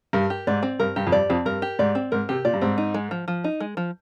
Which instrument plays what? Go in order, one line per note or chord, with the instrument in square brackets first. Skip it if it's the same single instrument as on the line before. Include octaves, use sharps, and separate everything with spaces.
[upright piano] G2 [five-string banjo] A#4
[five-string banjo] G4
[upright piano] G#2 [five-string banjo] D5
[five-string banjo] C4
[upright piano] G2 [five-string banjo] A#4
[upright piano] G2 [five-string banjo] G4
[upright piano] F2
[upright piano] G2 [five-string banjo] D5
[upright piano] F2 [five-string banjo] C4
[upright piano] G2 [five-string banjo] A#4
[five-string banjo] G4
[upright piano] G#2 [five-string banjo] D5
[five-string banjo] C4
[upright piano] G#2 [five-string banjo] A#4
[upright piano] C3 [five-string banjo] G4
[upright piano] A#2 [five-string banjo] D5
[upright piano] G2
[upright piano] G#2 [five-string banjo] C4
[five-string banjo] D#4
G#3
F3
F3
D#4
G#3
F3